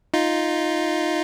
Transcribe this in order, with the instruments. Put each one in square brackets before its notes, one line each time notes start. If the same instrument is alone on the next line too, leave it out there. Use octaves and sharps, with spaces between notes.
[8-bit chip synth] D#4 F4